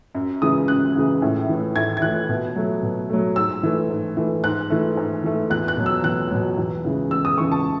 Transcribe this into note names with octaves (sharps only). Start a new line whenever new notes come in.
F#2
C#3 E3 G#3 D#6
F#2 F#6
C#3 E3 G#3
A2
E3 A3
A2 G#6
G#6
E3 A3 F#6
B2
F#3 A3
B2
F#3 A3
G#2 E6
E3 A3
G#2
E3 A3
G#2 F#6
E3 A3
G#2
E3 A3
E2 F#6
F#6
B2 F#3
E6
E2 F#6
B2 F#3
E2
C#3 E3 G#3
E2 E6
D#6
C#3 E3 G#3 C#6
A5